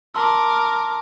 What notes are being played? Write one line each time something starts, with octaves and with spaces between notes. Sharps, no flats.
A#4 A5 C6 D6 E6